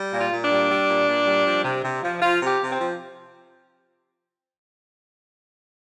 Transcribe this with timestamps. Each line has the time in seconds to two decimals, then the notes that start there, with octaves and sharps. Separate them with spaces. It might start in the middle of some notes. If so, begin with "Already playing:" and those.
Already playing: G3
0.12 A#2
0.19 F4
0.32 A#2
0.45 D4
0.51 G3
0.70 G3
0.88 A#2
1.07 A#2
1.26 G3
1.46 F3
1.64 C3
1.83 C3
2.02 F3
2.22 F3 F4
2.40 C3
2.47 G4
2.59 C3
2.72 C4
2.78 F3